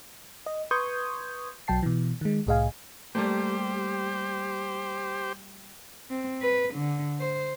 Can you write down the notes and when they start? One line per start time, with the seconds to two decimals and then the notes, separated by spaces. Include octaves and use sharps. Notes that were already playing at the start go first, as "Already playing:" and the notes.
0.46 D#5
0.71 B4 C6 C#6 D#6 G6 G#6
1.68 B1 F#3 G5 A5 C7
1.83 B2 E3
2.21 D#3 G#3
2.47 C2 A2 G#4 D#5 F5 G#5
3.15 G3 A3 A#3 G4 C5
6.10 C4
6.41 B4
6.75 D3
7.20 C5